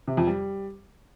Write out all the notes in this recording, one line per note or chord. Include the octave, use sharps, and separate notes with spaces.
C3
F2
G3